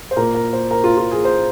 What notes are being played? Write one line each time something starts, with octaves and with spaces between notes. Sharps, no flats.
C5
A#2 A#3 A#4
A#4
C5
A#4
F4
F4
G#4
C5